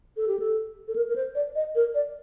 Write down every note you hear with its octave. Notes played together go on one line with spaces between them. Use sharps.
A4
G4
A4
A4
A#4
A#4
C5
D5
D#5
A#4
D5